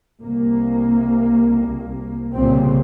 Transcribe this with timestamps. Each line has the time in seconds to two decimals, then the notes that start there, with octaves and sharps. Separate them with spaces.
0.22 C2 A#3
2.34 C2 A#2 C#3 C4